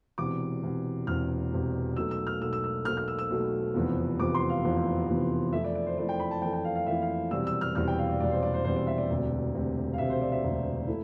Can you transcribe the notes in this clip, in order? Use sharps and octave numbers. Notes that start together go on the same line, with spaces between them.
E1 E2 C3 D6
E1 E2 C3
E1 E2 C3 F6
E1 E2 C3
B1 B2 A3 E6
E6
F6
B1 B2 A3 E6
E6
E6
B1 B2 A3 F6
F6
E6
E6
B1 B2 A3
F1 E2 C3 F3 B3
F1 E2 C3 F3 B3 D6
C6
F5
F1 E2 C3 F3 B3
F1 E2 C3 F3 B3
F2 E3 A3 E4 E5
D5
D5
C5
F2 E3 A3 E4 D5
G5
B5
A5
F2 E3 A3 E4 G5
G5
F5
F5
F2 E3 A3 E4 E5
F5
E1 E2 C3 G3 E6
E6
F6
E1 E2 C3 G3 F6
G5
F5
D5
E1 E2 C3 G3 D5
C5
D5
C5
E1 E2 C3 G3 C5
D5
E5
D5
E1 D2 C3
E1 D2 C3
F5
E1 D2 C3 E5
C5
D5
E5
E1 D2 C3
A3 E4